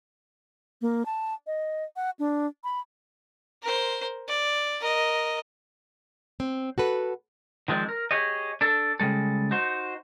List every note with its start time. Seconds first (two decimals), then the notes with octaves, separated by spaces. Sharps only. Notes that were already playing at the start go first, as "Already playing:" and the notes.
0.82 A#3
1.06 A5
1.47 D#5
1.96 F#5
2.19 D4
2.64 B5
3.62 A#4 C5
4.28 D5
4.80 A#4 D#5
6.40 C4
6.78 F#4 A4 B4
7.68 D#3 F3 G#3 C4 D5
7.89 A#4
8.11 G4 G#4 C#5 D#5
8.61 D4 A4
9.00 C#3 G3 G#3 A4
9.51 D#4 F#4 C5